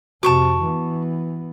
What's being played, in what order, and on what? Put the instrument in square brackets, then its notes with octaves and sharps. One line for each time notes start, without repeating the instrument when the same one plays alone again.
[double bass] F2 C3 [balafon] F#4 [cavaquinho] A5 C#6 D6
[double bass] E3 B3